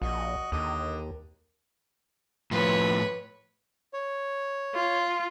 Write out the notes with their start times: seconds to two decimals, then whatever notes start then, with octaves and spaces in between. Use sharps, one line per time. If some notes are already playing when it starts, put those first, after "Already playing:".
0.02 A#1 F#4 D#5
0.52 D#2 D3 D#5
2.51 A2 F3 B4 C#5
3.93 C#5
4.74 F4